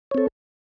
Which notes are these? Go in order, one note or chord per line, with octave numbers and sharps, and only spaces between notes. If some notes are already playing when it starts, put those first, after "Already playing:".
C4 A4 C#5